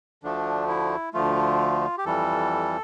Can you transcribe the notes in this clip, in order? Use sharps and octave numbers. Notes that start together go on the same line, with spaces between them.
D2 D3 F3 A3 D4
E4
D2 D3 F3 A3 F4
G4
F2 E3 G3 A4